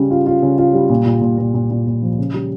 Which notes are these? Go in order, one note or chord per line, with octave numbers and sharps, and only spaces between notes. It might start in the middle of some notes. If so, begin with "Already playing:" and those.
Already playing: C#3 G3 C#4
F4
F4
C#3
F4
G3
A#2
A#2
A#2
A#2
A#2
A#2
A#2
F3
C#3
G3